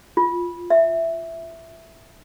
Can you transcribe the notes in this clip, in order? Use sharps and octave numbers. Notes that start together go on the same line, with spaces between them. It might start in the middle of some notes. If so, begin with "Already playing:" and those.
F4
E5